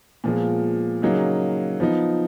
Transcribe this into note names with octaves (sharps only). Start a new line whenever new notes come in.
A#2 F3 G#3 B3
C#3 F#3 A#3 D#4 G#4
F3 B3 D#4